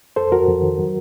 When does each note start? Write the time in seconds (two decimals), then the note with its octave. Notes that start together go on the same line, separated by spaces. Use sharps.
0.16 F2 A4 C5
0.32 F2 F#4 A#4
0.48 F2
0.63 D#3
0.78 F#3